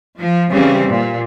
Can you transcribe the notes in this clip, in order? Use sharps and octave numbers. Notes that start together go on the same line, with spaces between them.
F3
C#3 E3 G3 C4
A#2